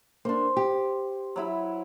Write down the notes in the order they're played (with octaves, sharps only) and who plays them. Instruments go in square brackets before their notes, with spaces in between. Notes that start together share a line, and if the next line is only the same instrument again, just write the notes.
[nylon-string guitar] A#3 D4 [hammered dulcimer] C5
[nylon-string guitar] G4
[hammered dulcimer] F#3 E4 B5